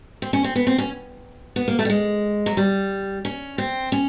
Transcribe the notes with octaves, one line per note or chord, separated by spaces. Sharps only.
C4
C#4
C4
B3
C4
C#4
B3
A#3
A3
G3
G#3
F#3
G3
C#4
C4
C#4